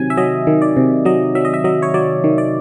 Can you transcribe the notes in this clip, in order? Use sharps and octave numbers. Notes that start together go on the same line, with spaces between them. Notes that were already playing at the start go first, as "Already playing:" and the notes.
Already playing: C3 D#3 F#3 G#5
E5
F#3 D#5
D#3
D5
C3
F#3 D#5
F#3 E5
D#5
E5
F#3 D#5
C#5
F#3 D5
D#3
D5